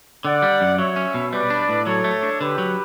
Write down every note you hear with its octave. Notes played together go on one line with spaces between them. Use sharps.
D3 D5 F#5
G3
F#2
F#3 C#5 E5
C#4
B2
G3 B4 D5
D4
A2
F#3 A4 C#5
A3
D4
D3 G4 B4
F#3